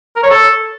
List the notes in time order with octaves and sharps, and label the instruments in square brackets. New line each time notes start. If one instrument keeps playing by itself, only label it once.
[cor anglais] A#4
C#5
A4